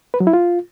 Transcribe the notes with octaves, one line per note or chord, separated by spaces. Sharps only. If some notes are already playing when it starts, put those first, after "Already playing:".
B4
F#3
E4
F4